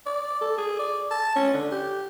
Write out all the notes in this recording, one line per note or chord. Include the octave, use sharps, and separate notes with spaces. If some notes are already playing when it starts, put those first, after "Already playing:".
D5
A4
G#4
D5
A5
C#4
D3
G4